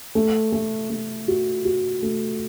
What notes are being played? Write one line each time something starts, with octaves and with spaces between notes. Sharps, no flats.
A3
A3
A3
F#4
F#4
A3